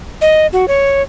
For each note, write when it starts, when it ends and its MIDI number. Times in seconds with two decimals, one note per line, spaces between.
0.21 0.47 75
0.53 0.65 66
0.68 1.02 73